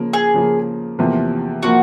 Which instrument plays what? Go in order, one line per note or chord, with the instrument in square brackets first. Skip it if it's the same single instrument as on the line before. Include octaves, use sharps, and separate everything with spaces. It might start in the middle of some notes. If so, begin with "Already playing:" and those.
Already playing: [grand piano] C#3 F3 A#3
[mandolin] G#4
[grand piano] C#3 F3 A#3
E2 C3 F3 A#3
[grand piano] C3 F3 A#3 [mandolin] F#4